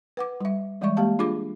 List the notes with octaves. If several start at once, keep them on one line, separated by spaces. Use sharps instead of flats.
B4 F#5 D6
G3 E5
E3 G3 G#3 D5 E5 C#6
G#3 A#3 G4 F5 A5
D4 F4 G#4 D6